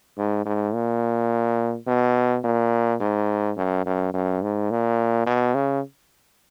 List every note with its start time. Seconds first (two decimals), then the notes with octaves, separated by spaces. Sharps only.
0.18 G#2
0.45 G#2
0.74 A#2
1.87 B2
2.44 A#2
3.00 G#2
3.57 F#2
3.86 F#2
4.14 F#2
4.42 G#2
4.71 A#2
5.27 B2
5.55 C#3